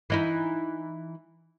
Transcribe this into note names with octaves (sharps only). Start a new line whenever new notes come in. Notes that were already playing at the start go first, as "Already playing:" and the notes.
E3 D#4 E4